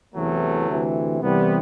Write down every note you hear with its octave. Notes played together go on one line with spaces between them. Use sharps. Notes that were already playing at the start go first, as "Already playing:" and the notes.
E2 C3 E3 F#3 A3
D2 C3 E3
C2 C3 E3 G3 B3